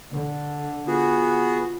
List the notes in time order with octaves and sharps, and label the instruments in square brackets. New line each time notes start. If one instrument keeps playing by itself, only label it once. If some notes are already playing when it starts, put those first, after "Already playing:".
[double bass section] D3
[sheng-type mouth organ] B3 F#4 G#4 [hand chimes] F4